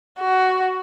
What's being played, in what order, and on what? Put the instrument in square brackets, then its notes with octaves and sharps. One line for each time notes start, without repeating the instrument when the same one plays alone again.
[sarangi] F#4